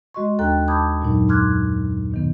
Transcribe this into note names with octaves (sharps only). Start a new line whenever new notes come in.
G#3 F#4 D#5 C6 C#6
D#2 D4 A4 G5 A#5 F#6
A5 B5 D6 D#6 G6 G#6
F#2 A#2 F#3 D#4
C6 D6 F6 F#6 G#6
B2 D#3 B3